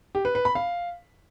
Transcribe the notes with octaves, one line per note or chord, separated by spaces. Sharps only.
G4
B4
B4
B5
F5